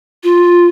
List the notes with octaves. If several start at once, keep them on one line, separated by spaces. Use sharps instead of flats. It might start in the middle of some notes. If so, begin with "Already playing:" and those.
F4